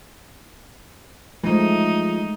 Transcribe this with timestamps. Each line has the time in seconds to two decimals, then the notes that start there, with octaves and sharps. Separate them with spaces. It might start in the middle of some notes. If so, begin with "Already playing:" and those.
1.44 E3 F3 G#3 A3 D#4